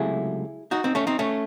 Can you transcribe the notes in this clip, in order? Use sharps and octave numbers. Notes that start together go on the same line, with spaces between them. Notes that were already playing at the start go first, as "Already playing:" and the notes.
Already playing: C#2 C3 F#3 A3 E4 G#4
D#4 F#4
C4 D#4
A3 C#4
C4 D#4
A3 C#4